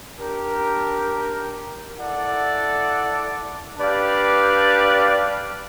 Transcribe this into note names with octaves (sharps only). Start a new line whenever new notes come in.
D4 G4 A#4
E4 A4 D5 F#5
D4 G4 B4 D5 F5